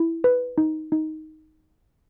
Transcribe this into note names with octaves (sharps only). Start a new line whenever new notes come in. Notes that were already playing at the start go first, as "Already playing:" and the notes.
Already playing: E4
B4
D#4
D#4